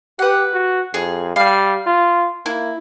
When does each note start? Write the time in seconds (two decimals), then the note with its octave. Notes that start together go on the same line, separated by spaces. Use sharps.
0.19 G4 B4 F#5
0.53 F#4
0.94 F2 G#4
1.36 G3 F5
1.86 F4
2.46 A#3 E4